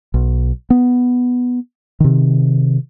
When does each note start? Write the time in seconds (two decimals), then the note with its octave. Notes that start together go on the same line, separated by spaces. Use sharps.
0.14 B1
0.70 B3
2.00 C3 D#3